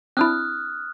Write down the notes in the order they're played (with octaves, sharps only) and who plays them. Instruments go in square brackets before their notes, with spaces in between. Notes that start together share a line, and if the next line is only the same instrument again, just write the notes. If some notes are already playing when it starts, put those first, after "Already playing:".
[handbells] C4 D4 E4 [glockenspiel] D#6 F6 F#6